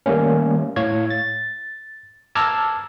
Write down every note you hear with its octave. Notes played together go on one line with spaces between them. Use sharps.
D#3 G3 A3 A#3 C#4
A2 C#5 F5 G#6
A6
A5 A#5 D6 E6 F6 G#6